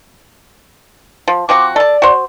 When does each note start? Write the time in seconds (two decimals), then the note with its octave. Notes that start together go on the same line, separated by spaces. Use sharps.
1.28 F3
1.49 F3 C4 F#4 D6
1.76 A4 D5 A5
2.02 F#4 C5